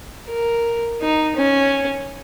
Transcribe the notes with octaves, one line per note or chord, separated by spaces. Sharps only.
A#4
D#4
C#4